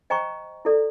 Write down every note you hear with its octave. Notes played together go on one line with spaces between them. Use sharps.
C5 D#5 G5 A#5 C#6
E4 A4 D5